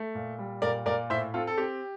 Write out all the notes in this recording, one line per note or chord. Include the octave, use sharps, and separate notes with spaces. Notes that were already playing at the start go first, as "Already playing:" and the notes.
Already playing: A3
A#2
G3
A#2 A#4 D5
A#2 A#4 D5
A2 C5 E5
C4 F4 A4
A4
C4 G4